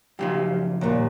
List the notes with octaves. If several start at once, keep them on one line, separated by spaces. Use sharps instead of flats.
F#2 C#3 F3 G4
D#2 A#2 G3